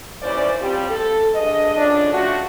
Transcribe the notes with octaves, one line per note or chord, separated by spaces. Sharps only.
D#2 E3 C#4 C5 D5
F3 G3 C4 G4
A4
G2 D4 G#4 D#5
A2 C#3 F3 D4
F3 A3 F#4